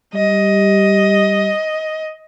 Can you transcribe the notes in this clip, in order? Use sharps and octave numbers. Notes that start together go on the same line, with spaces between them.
G3 D#5